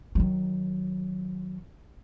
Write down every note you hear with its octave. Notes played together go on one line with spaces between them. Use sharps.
D#3 F#3